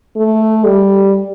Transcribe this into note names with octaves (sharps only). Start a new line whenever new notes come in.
A3
G3